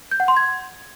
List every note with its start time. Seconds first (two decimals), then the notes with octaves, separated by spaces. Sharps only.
0.11 G6
0.20 F#5
0.28 C6
0.37 G#6